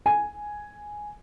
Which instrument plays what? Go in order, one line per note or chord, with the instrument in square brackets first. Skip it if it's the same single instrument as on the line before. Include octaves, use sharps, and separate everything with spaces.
[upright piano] G#5